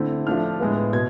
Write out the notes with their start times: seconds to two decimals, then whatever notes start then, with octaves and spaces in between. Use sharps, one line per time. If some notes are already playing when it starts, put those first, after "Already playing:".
Already playing: D3 A3 C4 E4
0.27 F3 A3 D4 F6
0.60 A2 G#3 B3
0.93 B2 G#6